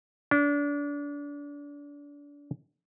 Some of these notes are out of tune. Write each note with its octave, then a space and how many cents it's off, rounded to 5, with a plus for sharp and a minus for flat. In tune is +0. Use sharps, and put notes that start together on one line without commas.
D4 -30